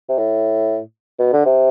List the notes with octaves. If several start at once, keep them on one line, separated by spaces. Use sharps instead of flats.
C3
A2
B2
D3
C3